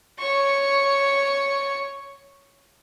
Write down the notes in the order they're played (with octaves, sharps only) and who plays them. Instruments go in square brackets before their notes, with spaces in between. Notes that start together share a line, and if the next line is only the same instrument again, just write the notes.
[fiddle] C#5 C#6